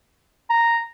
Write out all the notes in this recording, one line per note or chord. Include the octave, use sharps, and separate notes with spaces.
A#5